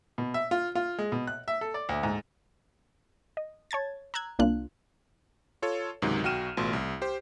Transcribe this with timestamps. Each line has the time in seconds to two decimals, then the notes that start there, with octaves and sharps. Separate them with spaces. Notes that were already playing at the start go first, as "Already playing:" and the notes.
0.18 B2
0.34 E5
0.51 F4
0.75 F4
0.98 G#3
1.12 B2
1.27 F#6
1.48 E5
1.61 A4
1.74 D5
1.89 D2
2.03 G#2
3.37 D#5
3.71 C#5 A5 G#6 A6
4.14 A#5 E6 F#6 G#6
4.39 C2 A#3 D4 F4 F#6
5.62 F4 A4 C#5
6.02 C#2 G#2 C3 D#3 F#3
6.24 B1 F#4 G5 F6 D#7 E7
6.57 A1 B2 A3 F4 C6
6.73 C2
7.01 G4 C5